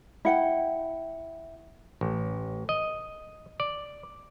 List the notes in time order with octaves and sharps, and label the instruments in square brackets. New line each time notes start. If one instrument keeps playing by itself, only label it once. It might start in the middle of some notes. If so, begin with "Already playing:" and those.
[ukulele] E4 F#5 G5
[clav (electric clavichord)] A1
D#5
D5